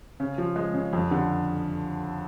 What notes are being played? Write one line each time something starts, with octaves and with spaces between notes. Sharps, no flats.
C#3
F3
G#3
C#3
F2
D3